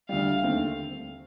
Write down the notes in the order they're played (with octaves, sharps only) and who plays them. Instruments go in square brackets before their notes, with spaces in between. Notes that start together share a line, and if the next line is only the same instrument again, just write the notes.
[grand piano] D2 D3 G3 [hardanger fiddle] F5
[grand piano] D#2 D3 A3 C4